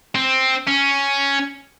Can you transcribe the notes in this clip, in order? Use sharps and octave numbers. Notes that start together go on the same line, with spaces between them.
C4
C#4